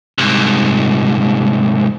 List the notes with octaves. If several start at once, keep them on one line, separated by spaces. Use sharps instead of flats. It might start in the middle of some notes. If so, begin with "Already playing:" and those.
C2 G#2